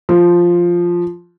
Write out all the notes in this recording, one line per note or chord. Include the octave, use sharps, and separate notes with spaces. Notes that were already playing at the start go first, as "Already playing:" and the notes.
F3